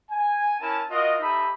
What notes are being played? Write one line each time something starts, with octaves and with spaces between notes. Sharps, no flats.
G#5
C#4 E4 A#4 A5
F4 F#4 A#4 D#5
D#4 G4 A4 E5 B5 D#6